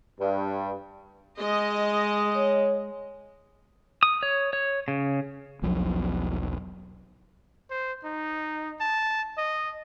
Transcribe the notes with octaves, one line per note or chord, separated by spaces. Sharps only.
G2
G#3 D#5
C#5
D#6
C#5
C#5
C#3
E1 B1 F3 F#3
C5
D#4
A5
D#5